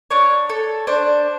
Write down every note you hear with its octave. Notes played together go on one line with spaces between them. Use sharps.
D4 C#5
A4
D4 C5